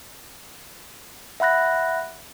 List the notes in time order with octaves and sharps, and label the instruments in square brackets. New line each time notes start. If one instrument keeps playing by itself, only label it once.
[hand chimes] E5 F#5 B5 F#6 A#6